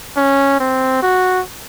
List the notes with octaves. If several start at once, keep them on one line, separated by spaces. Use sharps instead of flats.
C#4
C4
F#4